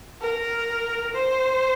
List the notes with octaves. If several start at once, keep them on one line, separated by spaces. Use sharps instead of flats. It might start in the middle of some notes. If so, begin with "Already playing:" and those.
A#4
C5